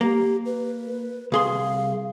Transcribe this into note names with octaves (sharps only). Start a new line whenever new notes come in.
A#3 G4
B4
C2 G#4 F5 C6